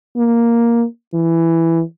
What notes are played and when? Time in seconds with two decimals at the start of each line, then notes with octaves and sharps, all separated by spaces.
0.17 A#3
1.14 E3